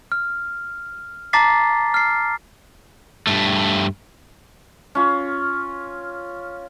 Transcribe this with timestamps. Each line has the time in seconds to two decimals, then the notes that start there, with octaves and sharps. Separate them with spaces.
0.12 F6
1.33 A5 A#5 D6 A6 B6 C7
1.94 F6 C7
3.27 G2 A3
4.95 C#4 F4